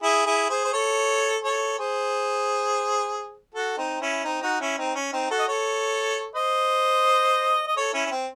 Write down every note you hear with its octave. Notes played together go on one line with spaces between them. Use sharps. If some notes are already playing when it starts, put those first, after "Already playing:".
E4 G#4
E4 G#4
G#4 C5
C5
A4 C#5
A4 C#5
G#4 C5
F#4 A4
C4 D#4
C#4 E4
C4 D#4
D#4 F#4
C#4 E4
C4 D#4
C#4
C4 D#4
F#4 A4
D#5
A4 C#5
C5 D#5
D#5
A4 C#5
C#4 E4
C#4
C4